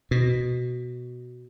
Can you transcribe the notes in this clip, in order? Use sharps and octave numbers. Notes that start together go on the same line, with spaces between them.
B2